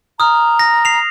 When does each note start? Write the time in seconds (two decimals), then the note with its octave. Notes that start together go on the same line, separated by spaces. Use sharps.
0.20 A#5 D#6 F6
0.59 A#6
0.85 C7 F7